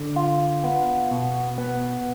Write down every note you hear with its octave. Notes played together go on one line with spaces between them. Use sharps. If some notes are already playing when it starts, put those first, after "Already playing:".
Already playing: D3
F4
B3
B2
B3